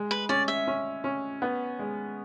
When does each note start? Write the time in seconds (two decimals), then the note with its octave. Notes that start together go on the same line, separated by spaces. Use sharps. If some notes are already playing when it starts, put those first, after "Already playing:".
Already playing: G#3
0.11 B4
0.29 C#4 D5
0.48 E5
0.67 C#4
1.04 C#4
1.42 B3
1.79 G#3